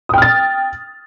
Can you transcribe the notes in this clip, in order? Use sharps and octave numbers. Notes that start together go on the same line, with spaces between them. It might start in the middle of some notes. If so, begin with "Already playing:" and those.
G5 D#6 F6 A6